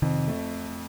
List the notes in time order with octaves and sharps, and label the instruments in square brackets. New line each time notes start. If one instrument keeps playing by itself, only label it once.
[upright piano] F2 [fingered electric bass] C3 D#3
[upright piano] A3